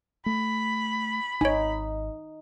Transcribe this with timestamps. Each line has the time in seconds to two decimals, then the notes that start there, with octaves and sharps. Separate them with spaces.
0.26 A3 B5
1.41 G#1 D#4 C#5 G#5